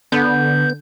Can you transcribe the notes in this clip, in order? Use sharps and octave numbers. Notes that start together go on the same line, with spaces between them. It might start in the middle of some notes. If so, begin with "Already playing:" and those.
D3 B3 G6